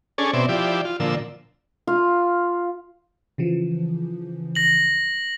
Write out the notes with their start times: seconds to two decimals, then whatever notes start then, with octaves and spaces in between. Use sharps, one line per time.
0.18 C#4 D4 G#4 A4
0.33 B2 C4 D5 E5
0.49 F3 E4 G4 D5
0.85 F4
1.00 A#2 D3 F3 E6
1.87 F4 F5
3.38 C#3 E3 F3
4.55 A#6 F#7